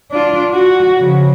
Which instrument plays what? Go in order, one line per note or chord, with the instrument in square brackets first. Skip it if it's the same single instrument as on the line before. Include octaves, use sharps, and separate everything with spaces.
[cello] D4 F4
F#4
C#3 F3